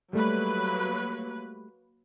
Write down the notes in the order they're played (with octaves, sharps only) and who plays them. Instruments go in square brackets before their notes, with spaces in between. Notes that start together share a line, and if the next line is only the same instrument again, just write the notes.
[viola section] F#3 A#3 B4 [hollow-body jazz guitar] G3 A3